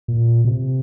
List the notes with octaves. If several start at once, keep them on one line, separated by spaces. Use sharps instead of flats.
A#2
C3